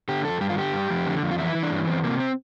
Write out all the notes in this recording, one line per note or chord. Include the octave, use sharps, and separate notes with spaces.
D3 G4
F2 A4
G2 G4
F4
D3 G4
G2
F2
D3
F2
F4
E3 E4
E3
D4
G2
E2 C4
C3 A#3
C4